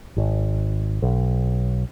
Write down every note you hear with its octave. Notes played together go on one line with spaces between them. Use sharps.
G#1
B1